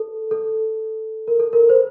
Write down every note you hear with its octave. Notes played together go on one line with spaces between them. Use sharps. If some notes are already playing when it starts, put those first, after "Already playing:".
Already playing: A4
A4
A#4
A4
A#4
C5
B4